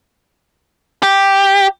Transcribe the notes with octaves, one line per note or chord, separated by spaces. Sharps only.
G4